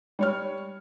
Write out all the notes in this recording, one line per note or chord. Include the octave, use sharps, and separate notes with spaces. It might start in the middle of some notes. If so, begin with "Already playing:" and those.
G3 C#5 F6